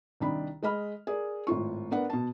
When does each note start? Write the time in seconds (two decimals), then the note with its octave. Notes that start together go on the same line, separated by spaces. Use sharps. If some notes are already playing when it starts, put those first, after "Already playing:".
0.20 C2 D#3 D4 B5
0.63 G#3 D#5 B5 F6
1.07 G#4 A#4 D5
1.47 G#1 A2 F4 C#6
1.91 B3 D4 A#4 B4 F#5
2.10 B2 A5